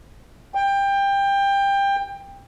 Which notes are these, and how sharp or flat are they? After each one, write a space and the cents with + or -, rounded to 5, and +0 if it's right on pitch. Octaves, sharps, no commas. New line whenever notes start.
G5 +20